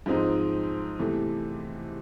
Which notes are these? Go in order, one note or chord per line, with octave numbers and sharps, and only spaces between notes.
G#2 F3 G#3 C4 D#4
E2 C3 E3 A3